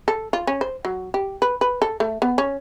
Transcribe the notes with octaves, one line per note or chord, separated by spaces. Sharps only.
A4
F4
C#4
C5
F#3
G4
B4
B4
A4
A3
B3
C#4